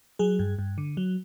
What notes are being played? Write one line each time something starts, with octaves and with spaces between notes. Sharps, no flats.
F#3 G#4
G2
G2
D3
F#3